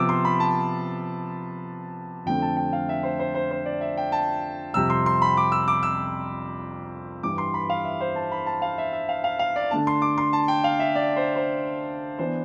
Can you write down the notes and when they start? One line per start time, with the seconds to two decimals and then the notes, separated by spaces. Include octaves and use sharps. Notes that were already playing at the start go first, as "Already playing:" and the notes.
Already playing: C3 F3 B3 D6 E6
0.09 C6
0.25 B5
0.40 A5
2.26 F2 D3 A3 C4 G5
2.42 A5
2.57 G5
2.73 F5
2.89 E5
3.03 C5
3.19 C5
3.35 C5
3.51 C5
3.66 D5
3.81 E5
3.97 G5
4.12 A5
4.74 F2 C3 G3 E6
4.90 C6
5.06 C6
5.22 B5
5.37 D6
5.52 E6
5.68 D6
5.83 E6
7.23 G2 E3 G3 D6
7.38 C6
7.54 B5
7.70 F5
7.85 E5
8.00 C5
8.16 A5
8.32 B5
8.46 A5
8.62 F5
8.78 E5
8.93 E5
9.09 F5
9.24 F5
9.39 F5
9.56 D5
9.71 D3 A3 D4 A5
9.87 C6
10.02 D6
10.18 C6
10.33 A5
10.48 G5
10.64 F5
10.79 E5
10.95 D5
11.16 C5
11.36 C5
12.19 E3 B3 D4 C5